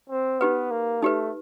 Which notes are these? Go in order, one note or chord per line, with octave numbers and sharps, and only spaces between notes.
C4
B3 D#4 G4 B4
A#3
A3 D#4 G4 B4